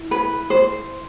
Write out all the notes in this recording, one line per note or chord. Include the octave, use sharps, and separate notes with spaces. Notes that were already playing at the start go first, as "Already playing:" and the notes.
Already playing: E4
B4
C5